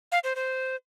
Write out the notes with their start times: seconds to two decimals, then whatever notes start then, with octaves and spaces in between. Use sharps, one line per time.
0.12 F5
0.24 C5
0.36 C5